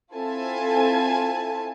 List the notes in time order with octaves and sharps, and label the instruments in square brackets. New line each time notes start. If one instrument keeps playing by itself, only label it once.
[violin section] C4 E4 F4 A4 G#5 A5